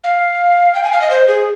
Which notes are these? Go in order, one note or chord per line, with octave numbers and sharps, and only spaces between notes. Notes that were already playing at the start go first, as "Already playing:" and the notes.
F5
G5
G#5
F5
D#5
C5
G#4